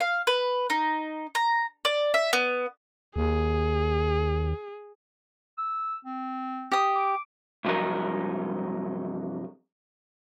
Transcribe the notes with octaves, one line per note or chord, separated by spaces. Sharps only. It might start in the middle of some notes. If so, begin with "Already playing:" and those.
F5
B4
D#4
A#5
D5
E5
B3
D#2 G#4
E6
C4
G4 D#6
D6
C2 G2 F3 F#3 D#4 A#4